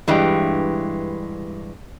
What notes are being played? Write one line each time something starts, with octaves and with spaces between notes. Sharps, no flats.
G2 E3 G#3 D4 G4